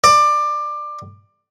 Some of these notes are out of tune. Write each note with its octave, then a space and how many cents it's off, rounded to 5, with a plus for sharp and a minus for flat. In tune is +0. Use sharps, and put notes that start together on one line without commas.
D5 +20